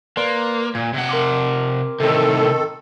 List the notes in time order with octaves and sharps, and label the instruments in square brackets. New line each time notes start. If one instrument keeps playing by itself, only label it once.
[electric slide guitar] A#3 [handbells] B4 D5 C6
[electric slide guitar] A#2 [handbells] G#6
[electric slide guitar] C3 F#5
[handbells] A#4 C6 D6
[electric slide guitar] A2 C3 [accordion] D#3 A4